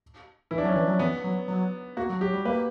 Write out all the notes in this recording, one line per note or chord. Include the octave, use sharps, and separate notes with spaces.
E3 E4
D4
F#3 C#4
D4
E3
F#3
E3 B3
F#3
F#3
A#3 F#4
F#3
F#3 G4
G3
A#3 B4